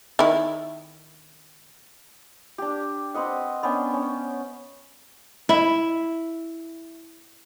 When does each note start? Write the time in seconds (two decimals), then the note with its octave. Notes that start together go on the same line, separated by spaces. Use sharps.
0.19 D#3 E4 E5
2.58 D4 G4
3.14 C4 B4 D#5 F#5
3.63 B3 C#4 D4 G5
3.94 C#4
5.49 E4 E5